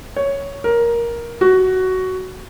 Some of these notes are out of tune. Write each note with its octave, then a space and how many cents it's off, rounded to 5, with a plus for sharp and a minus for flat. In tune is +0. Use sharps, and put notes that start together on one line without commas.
C#5 +5
A#4 +10
F#4 +10